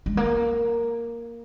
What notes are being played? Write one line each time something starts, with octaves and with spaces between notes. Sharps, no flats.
G#3
A#3